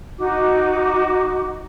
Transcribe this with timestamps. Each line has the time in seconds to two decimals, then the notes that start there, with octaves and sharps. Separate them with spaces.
0.19 D#4 F#4 D6